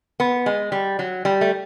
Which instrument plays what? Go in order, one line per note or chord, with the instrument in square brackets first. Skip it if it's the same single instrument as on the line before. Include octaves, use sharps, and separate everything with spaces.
[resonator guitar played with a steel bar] B3
G#3
G3
F#3
G3
A3